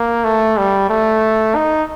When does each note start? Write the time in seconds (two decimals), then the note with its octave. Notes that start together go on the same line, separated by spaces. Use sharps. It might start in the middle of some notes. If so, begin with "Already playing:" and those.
Already playing: A#3
0.25 A3
0.57 G3
0.89 A3
1.56 D#4